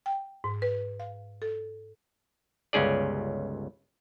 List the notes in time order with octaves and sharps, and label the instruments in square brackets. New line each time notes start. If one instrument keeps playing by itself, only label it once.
[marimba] G5
G#2
B4
F5
A4
[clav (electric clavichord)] G1 C#2 C#4 G#4 D5